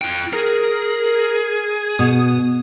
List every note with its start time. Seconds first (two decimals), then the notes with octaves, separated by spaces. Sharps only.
0.01 F4 G5
0.33 G#4 A#4
1.99 B2 D#6